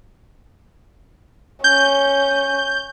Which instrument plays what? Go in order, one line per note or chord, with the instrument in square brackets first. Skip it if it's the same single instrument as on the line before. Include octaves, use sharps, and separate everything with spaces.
[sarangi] C#4 [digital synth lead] G6